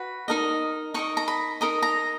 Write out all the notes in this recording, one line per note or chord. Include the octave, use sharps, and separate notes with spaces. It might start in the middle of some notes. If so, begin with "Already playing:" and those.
Already playing: F#4 B4
D#4 A#4 D#5
D#4 A#4 D#5 C#6
A#5
B5
D#4 A#4 D#5 A#5
A#5